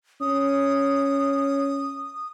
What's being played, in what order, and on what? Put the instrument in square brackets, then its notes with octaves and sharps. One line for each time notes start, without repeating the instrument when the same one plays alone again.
[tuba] C#4 [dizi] D#6